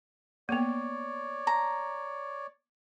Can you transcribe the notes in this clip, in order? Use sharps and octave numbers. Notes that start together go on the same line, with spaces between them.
A#3 B3 C#5 D5
A#5